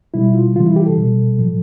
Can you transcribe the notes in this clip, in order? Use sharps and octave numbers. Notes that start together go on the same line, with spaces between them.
B2 G3 E4
F4
C3 E3 G3 F4
E4
G4
A4
B2 G3
A2 F3